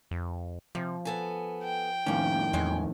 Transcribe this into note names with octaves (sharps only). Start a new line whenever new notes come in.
F2
C3 F3
B3 A4 G#5
G5
F2 A2 D#3 A#3 C#4
E2 G#3 C#4 G#5